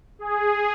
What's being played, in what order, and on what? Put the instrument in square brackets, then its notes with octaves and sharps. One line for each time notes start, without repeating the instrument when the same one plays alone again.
[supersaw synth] G#4